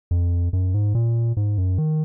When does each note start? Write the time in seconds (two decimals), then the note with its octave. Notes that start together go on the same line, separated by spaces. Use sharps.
0.11 F2
0.53 F#2
0.74 G#2
0.95 A#2
1.37 G#2
1.58 F#2
1.78 D#3